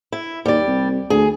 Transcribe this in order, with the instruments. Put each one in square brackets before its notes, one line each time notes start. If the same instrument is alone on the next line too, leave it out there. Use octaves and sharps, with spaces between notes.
[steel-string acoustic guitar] E4
[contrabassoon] D#2 [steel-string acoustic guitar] G3 D5
[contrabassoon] C2
[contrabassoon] D2 [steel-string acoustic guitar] G#4